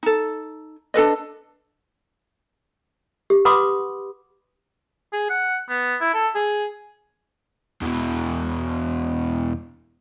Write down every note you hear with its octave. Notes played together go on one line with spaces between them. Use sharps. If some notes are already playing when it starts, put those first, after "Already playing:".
D#4 A4
D4 A4 B4 D#5
G4
B4 F#5 B5 C6 D6 D#6
G#4
F#5
B3
E4
A4
G#4
E2 B2